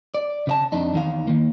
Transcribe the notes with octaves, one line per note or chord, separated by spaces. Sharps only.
D5
C#3 D5 A5
F2 D4 D#4
E2 D#3 F5
D#3 A#3